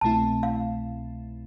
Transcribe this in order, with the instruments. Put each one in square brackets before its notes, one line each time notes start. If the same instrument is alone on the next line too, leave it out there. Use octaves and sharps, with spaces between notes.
[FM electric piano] C2 B2 A3 C4 E4 [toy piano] A5
[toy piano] F5